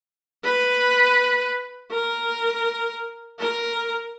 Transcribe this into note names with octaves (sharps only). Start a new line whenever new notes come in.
B4
A#4
A#4